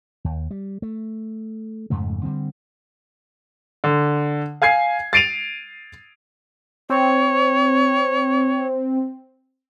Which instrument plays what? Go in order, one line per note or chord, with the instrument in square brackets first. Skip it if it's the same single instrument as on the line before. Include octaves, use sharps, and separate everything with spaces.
[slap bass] D#2
G3
A3
F2 G#2 C#3 A3
D3 G3 C4
[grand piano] D3
F5 G#5 G#6 C7
A6 C7 D7 D#7 F7
[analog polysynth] C4 [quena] C#5